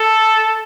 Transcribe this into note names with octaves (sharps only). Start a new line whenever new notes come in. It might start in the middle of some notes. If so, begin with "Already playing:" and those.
Already playing: A4